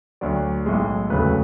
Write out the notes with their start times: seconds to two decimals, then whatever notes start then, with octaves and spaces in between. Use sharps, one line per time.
0.21 D2 D3 F#3 D5
0.66 B1 A2 G#3
1.10 E1 D2 C#3 F#3 A3 B4